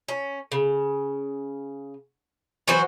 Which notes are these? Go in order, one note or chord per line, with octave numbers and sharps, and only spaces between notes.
C#4
C#3
E3 F#3 F#4 C5